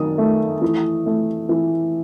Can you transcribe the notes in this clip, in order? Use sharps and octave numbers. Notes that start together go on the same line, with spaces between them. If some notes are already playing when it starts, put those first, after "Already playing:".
Already playing: D#3 F#3 D#6
A3
E3
A3
E3